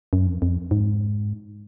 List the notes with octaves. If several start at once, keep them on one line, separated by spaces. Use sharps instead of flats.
F#2
F2
F2
G#2